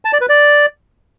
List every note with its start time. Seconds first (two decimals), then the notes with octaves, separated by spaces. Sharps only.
0.05 A5
0.13 D5
0.21 B4
0.29 D5